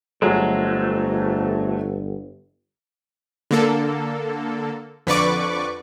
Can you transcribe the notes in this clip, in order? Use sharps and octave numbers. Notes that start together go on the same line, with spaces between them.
G1 F2 F#3 G#3 A3
D3 A#3 A4
F2 D3 B4 D5 C#6 D6